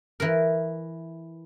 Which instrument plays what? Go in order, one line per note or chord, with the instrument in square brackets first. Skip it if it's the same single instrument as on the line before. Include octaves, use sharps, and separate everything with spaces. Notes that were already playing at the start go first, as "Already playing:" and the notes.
[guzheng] E3 A#4